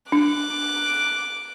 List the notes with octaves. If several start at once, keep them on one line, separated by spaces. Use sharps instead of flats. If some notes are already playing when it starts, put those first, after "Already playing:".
D4 D6 F#6